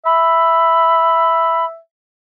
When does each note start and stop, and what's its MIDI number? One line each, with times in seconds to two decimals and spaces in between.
0.06 1.79 76
0.06 1.65 83